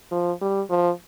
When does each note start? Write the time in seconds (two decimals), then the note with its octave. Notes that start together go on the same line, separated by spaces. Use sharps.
0.12 F3
0.41 G3
0.70 F3